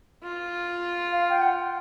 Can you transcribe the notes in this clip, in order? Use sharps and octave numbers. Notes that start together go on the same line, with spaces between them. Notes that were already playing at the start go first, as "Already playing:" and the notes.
F4
F5
G5
F#5